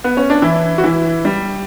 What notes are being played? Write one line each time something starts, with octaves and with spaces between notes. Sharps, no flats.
B3
C#4
D4
E3 E4
F#4
E3 E4
G3